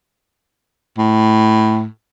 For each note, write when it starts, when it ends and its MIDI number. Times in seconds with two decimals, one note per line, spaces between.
0.98 1.86 45